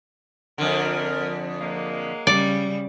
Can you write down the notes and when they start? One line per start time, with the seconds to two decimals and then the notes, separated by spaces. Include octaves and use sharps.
0.58 F2 D3 A#4
1.60 F#3 G#3 A#3
2.27 C#3 G3 D5